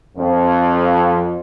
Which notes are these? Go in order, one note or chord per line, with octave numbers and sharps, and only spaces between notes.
F2